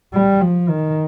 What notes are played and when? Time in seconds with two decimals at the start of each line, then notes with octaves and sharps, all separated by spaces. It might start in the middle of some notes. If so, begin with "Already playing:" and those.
0.13 G3
0.42 F3
0.69 D#3